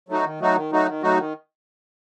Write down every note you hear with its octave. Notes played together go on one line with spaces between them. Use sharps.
F#3 A3 D#4 F#4
D#3
F#3 A3 D#4 F#4
D#3
F#3 A3 D#4 F#4
D#3
F#3 A3 D#4 F#4
D#3